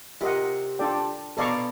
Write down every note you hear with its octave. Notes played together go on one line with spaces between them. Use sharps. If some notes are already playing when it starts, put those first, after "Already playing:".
C3 F4 A#4 D#5 F#5
D4 F4 A4 D5 G5
B2 A4 D5 F5 A#5 C#6